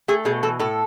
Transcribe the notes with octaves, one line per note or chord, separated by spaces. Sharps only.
A3 G#4
B2 G#4
E3 A4
A2 A4